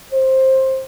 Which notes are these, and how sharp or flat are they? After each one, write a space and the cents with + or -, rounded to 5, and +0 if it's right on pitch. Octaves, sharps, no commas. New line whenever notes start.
C5 +15